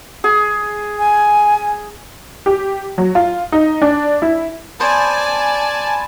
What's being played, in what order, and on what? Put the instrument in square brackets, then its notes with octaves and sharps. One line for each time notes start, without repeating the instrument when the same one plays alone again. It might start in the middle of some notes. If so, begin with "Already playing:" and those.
[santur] G#4
[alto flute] G#5
[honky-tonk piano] G4
F#3
F4
D#4
D4
E4
[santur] B3 C5 [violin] D5 [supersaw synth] G#5 A5